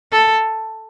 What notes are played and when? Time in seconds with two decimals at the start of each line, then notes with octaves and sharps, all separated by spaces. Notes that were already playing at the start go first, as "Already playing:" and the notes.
0.12 A4